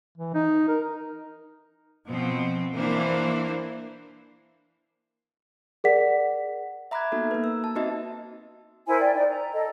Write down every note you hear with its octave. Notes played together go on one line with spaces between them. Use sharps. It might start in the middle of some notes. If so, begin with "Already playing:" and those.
E3
D#4
A#4
B2 F3 C4
E3 A#3 D4 E4 C5
G#4 A#4 D5 F#5 B6
E5 A#5 B5 D6 F#6 G#6
A#3 B3 D#4 F#4 A4
A#3 B4
E6
A5
C4 D#4 F#4 D#5 E5
E4 A#4 C5 G#5
D5 G5
D#4 D5
A#5
A4 D#5